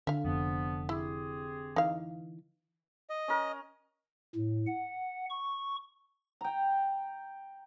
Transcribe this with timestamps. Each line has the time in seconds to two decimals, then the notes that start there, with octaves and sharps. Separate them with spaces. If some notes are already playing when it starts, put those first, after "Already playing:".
0.07 D3 D4 E5 F5
0.25 F1 F2 F3 B3
0.89 C4 E4 G4 G#4
1.76 E3 D#4 F5
3.10 D#5
3.28 C#4 A#4
4.35 A2
4.67 F#5
5.30 C#6
6.41 G5 A#5